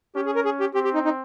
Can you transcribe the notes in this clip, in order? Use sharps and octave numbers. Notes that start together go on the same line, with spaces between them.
C#4 G4
G#4
A#4
G#4
G4
C4 G4
G4
D#4
D#4